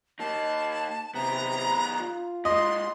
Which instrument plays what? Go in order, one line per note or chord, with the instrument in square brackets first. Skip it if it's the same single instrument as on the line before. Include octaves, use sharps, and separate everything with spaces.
[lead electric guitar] A#3 D#4 [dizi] A5
[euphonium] C3 [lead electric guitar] D#3 B3 [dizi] A#5
[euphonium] F4
[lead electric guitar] A#2 G#3 [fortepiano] D#5 [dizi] C6